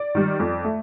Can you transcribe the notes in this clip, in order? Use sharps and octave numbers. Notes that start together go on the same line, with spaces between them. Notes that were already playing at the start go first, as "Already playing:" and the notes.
Already playing: D5
D#3 G3
F2
A3